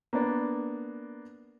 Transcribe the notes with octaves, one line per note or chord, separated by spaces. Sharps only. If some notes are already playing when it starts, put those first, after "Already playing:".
A#3 B3 D4 D5